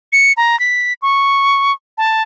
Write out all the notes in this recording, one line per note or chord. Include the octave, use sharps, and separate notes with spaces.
C#7
A#5
B6
C#6
A5